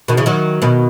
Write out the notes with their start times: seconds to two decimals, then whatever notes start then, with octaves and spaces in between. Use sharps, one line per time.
0.08 B2 D#3
0.17 C#3 E3
0.26 D#3 F#3
0.62 B2 D#3